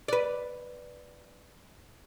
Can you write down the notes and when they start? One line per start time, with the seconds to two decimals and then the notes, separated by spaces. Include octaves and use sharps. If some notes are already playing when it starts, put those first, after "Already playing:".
0.08 B4 D5